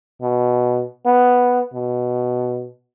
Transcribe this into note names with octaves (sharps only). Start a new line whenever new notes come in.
B2
B3
B2